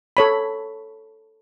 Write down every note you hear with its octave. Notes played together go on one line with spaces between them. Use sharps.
A4 C#5 B5